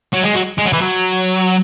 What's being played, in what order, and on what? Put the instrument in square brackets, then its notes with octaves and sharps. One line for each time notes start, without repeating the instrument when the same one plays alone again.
[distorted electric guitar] F#3
G#3
F#3
G#3
F#3
E3
F#3